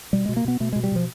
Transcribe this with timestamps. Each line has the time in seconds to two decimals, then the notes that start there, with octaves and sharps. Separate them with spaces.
0.13 B2 G3
0.26 B2 G#3
0.37 A#3
0.45 B2 B3
0.60 B2 A3
0.72 B2 G#3
0.83 G3
0.92 B2 F3